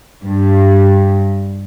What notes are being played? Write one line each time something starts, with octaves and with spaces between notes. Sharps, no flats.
G2